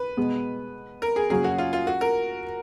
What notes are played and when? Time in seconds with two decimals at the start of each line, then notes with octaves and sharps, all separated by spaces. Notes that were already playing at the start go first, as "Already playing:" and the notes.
Already playing: B4
0.17 B2 G#3 B3
1.02 A#4
1.16 G#4
1.30 F#2 C#3 F#3 A#3 C#4 G#4
1.44 F#4
1.58 F4
1.73 F4
1.87 F#4
2.01 A#4